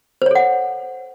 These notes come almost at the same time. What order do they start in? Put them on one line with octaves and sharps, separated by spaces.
C5 C#5 A4 F#5